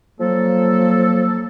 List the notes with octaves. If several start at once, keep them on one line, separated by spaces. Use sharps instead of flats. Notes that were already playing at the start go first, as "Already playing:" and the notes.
F3 F#3 A#3 A4